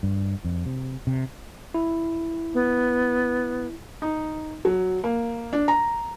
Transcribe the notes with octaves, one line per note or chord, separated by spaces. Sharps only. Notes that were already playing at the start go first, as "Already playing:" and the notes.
G2
F2
C3
C3
E4
B3
D#4
F#3
A#3
D4
A#5